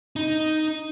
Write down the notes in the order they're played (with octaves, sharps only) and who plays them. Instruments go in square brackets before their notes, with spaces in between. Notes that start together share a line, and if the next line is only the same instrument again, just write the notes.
[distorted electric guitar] D#4